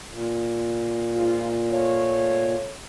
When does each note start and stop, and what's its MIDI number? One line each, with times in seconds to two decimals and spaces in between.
0.12 2.55 46
1.16 1.51 44
1.16 1.51 65
1.70 2.70 57
1.70 2.70 65
1.70 2.70 73